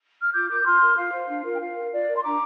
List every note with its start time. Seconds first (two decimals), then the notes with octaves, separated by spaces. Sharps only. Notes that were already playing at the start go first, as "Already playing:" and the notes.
0.22 F6
0.33 F4 D6 G6
0.49 A#4 D6 G6
0.60 D6
0.65 F4 C6 F6
0.81 A#4
0.96 F4 F5
1.12 C5
1.28 D4
1.44 F4 A#4
1.54 G5
1.60 F4 F5
1.76 A#4
1.91 F4 D5
2.08 A#4
2.16 C6
2.24 D4 A#5 D6